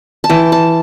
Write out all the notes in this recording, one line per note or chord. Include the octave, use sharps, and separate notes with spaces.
A5
E3 G5
A5